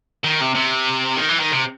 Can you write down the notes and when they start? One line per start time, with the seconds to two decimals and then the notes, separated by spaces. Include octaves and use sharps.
0.25 D#3
0.41 C3
0.55 C3
1.17 D#3
1.29 E3
1.40 D#3
1.52 C3